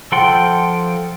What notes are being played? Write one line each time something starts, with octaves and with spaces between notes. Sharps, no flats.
F3 A4 F#5 G5 C6